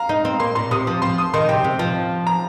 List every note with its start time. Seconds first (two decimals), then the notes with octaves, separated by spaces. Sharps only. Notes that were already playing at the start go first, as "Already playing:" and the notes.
Already playing: F5 A#5
0.09 D#4
0.25 C4
0.40 A#3 C6
0.55 A#2 C6
0.71 C3 D#6
0.87 F3
1.02 F3 C6
1.18 D#6
1.33 D#3 C6
1.49 C3 G5
1.64 C3
1.79 F3
2.27 A#5